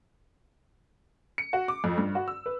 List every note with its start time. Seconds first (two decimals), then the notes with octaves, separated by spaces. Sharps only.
1.38 C#7
1.53 F#4
1.68 D6
1.84 F2
1.98 G2
2.15 F#4
2.28 E6
2.46 B4